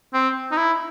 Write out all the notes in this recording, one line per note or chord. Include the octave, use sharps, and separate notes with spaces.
C4
D#4
E4